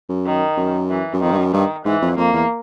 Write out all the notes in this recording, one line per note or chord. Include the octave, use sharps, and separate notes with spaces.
F#2
D#3
F#2
E3
F#2
F2 D#3
G2
F#2
G2 D#3
G#2 E3
F2
F2 A#3
E2